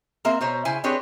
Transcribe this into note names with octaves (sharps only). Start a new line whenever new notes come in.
A#3 C4 A#4 E5
B2 C5 C#5 A#5
C#3 E4 C5 G#5
C4 D4 G4 G#4 B4 C#5